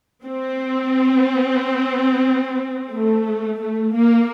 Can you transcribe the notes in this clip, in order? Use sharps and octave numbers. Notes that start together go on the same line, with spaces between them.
C4
A3
A3
A#3